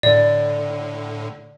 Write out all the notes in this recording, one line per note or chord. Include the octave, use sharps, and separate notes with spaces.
A2 D3 D5